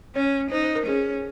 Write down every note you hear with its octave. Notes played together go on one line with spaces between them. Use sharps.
C#4 C#5
D#4 C5
C5
A#4
C#4 G#4